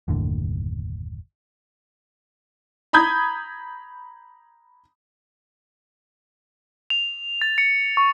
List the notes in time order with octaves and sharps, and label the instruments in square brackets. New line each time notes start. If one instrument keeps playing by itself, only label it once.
[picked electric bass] F#1 D#2 A2 D3
[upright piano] A#5 B5 D#6 G6 G#6
[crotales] F7
A6
C#7
C#6